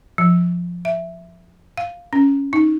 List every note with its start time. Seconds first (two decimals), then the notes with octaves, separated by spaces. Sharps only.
0.18 F3
0.85 E5
1.78 F5
2.13 C#4
2.53 D#4